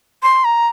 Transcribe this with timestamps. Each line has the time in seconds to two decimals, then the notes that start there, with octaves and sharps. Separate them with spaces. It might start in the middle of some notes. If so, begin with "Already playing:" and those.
0.23 C6
0.44 A#5